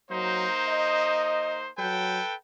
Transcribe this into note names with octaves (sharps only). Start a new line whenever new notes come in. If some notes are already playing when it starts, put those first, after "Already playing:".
F#3 A#3 D#4 C5
D#5
F#3 A4 B4 G5